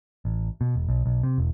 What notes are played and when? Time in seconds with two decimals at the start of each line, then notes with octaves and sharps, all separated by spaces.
0.25 A1
0.61 B2
0.75 E1
0.88 B1
1.06 B1
1.23 C3
1.38 E1